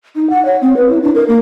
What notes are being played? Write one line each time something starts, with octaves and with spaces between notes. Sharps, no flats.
D#4
F#5
C#5
C4
B4
E4
D4
A#4
A#3